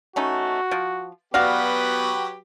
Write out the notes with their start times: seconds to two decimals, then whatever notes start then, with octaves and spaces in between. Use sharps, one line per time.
0.16 A3 C#4 D#4 F#4
0.71 F3
1.34 F#3 B3 F#4 G4 B4 D5 F5